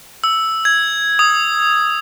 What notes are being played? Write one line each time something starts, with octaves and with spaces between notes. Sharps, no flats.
E6
G#6
D#6